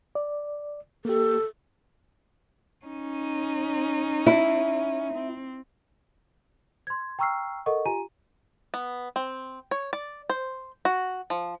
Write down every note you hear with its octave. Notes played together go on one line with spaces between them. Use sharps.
D5
A#3 G4 A4
C#4 D#4
E4
C4
C6 G#6
G5 A#5 C#6 E6 F6 C7
A4 A#4 D#5 F#5 C#6
F4 G4 G#5 A#5 D#7
B3
C4
C#5
D5
C5
F#4
F3